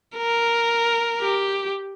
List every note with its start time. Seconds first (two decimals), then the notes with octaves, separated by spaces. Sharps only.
0.17 A#4
1.21 G4